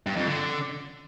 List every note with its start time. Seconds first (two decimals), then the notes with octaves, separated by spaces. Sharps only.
0.07 G2
0.16 F2
0.26 D3